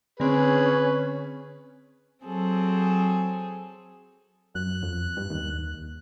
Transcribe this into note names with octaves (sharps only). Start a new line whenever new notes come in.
D3 C4 C#4 G#4 B4
F#3 C4 G#4 A4
F#2 F#6
F2
G2
D#2